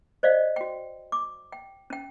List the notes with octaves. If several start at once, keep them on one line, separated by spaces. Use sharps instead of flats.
C5 D5 D#5 F5
F#4 G5
D6
G5
C#4 G5